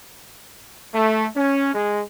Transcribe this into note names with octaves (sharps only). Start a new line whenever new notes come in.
A3
C#4
G#3